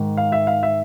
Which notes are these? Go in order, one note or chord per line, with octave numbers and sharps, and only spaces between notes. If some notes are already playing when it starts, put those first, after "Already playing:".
Already playing: G#2 D#3
F5
E5
F5
E5